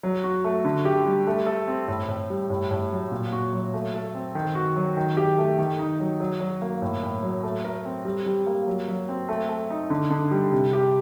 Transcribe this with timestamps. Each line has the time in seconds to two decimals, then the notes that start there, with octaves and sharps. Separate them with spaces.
0.03 F#3
0.24 F#4
0.44 A3
0.65 D3
0.85 G4
1.05 G3
1.27 A3
1.46 A4
1.67 C4
1.88 A2
2.08 A2
2.30 G3
2.50 A2
2.71 A2
2.92 F#3
3.12 A#2
3.32 F#4
3.53 F#3
3.74 A3
3.94 A4
4.15 C4
4.35 D#3
4.55 F#4
4.76 F#3
4.97 D#3
5.17 G4
5.38 A3
5.58 D#3
5.79 D#4
6.00 F#3
6.20 F#3
6.40 F#3
6.62 A#3
6.82 A2
7.03 A2
7.23 F#3
7.43 A3
7.64 A#4
7.85 C4
8.05 G3
8.26 G3
8.47 A#3
8.67 F#3
8.88 F#3
9.09 C4
9.29 A3
9.49 A3
9.70 D#4
9.90 D3
10.10 D3
10.31 G3
10.52 C3
10.73 G4